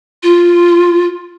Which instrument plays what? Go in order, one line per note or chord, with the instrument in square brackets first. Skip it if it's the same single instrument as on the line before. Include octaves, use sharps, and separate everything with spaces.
[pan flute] F4